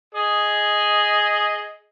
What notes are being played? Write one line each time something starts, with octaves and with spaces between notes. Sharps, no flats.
G#4 D#5